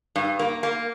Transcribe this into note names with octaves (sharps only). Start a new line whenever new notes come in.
G2
A#3
A#3